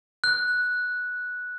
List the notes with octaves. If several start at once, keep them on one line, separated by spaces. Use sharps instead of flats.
F#6